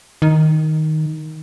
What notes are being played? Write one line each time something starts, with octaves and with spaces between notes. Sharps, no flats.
D#3